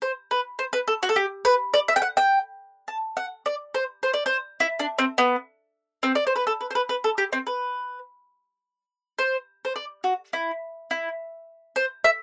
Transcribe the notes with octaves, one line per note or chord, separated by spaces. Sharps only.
C5
B4
C5
B4
A4
F#4
A4
G4
B4
D5
E5
G5
F#5
G5
A5
F#5
D5
C5
C5
D5
C5
E4
D4
C4
B3
C4
D5
C5
B4
A4
B4
C5
B4
B4
A4
G4
C4
B4
C5
C5
D5
F#4
E4
E4
C5
E5